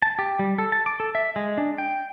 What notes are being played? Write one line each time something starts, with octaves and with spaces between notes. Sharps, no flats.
A5
G4
G3
A4
A5
D6
A4
E5
G#3
D4
G5